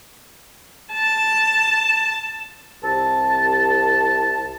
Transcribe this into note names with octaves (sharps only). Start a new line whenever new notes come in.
A5
C2 A5